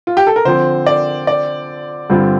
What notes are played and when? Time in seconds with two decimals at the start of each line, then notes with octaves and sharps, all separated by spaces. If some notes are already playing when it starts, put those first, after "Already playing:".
0.07 F4
0.17 G4
0.27 A4
0.36 A#4
0.45 D3 F3 C4 C5
0.86 D5
1.27 D5
2.09 G2 D3 G3 C4 F4